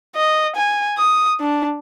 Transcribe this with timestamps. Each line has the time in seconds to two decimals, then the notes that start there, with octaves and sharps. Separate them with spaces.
0.16 D#5
0.56 G#5
0.98 D#6
1.40 D4